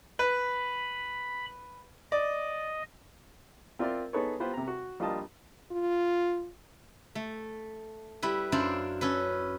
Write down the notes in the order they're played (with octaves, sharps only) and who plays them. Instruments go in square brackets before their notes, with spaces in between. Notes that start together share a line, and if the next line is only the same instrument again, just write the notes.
[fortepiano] B4 [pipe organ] B5
[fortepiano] D5 [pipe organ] D#5
[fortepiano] C4 F4 A#4 D5 E5 C6
B3 D#4 G#4 A4 B4 C#5
B3 F4 G4 B4 C5
C3 A#5
F#4
A#1 G3 F4 D#5 A5
[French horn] F4
[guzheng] A3
G3 E4 B4
F#2 D4 E4 C5 D5 F5
C#4 A4 B4